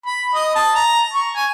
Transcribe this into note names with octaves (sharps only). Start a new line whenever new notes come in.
B5
D#5
A5
A#5
C#6
G#5